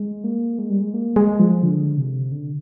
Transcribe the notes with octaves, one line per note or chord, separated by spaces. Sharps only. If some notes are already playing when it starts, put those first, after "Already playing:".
Already playing: G#3
A#3
G#3
G3
G#3
A#3
G#3
F3
D3
C3
D3